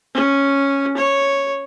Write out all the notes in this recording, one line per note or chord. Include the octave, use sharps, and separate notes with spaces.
C#4
C#5